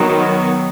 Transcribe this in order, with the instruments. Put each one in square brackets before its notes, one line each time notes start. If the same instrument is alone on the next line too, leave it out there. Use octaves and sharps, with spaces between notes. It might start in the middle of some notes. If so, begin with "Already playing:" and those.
Already playing: [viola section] D#3 F#3 B3